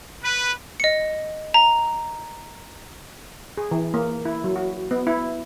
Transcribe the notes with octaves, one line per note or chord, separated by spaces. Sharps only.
B4
D#5 C#7
A#5
G#4
E3
A#3
E4
F#3
F#4
B3
E4